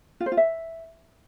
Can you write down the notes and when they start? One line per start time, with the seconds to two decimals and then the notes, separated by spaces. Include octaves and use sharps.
0.20 F4
0.26 C5
0.32 F4
0.37 E5